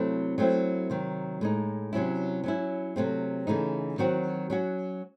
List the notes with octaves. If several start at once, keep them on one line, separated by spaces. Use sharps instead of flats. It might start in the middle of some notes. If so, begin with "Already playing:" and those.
Already playing: C3 F#3 A3 C4 E4
F#3 A3 C4 E4
C3 D#3 F#3
A2 G#3 D#4
C3 F#3 C#4 E4
F#3 C#4 E4
C3 F#3 A3 C4
C#3 E3 A3 D#4
D#3 F#3 C4 F#4
F#3 C#4 F#4